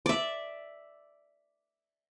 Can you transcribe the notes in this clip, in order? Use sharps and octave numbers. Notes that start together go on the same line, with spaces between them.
D5 E5